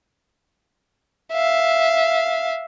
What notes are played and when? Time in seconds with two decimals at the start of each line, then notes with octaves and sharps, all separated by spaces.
1.33 E5 F5